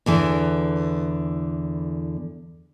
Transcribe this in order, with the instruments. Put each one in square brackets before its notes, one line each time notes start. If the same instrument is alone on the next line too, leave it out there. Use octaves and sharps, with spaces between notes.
[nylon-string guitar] E2 D3 E3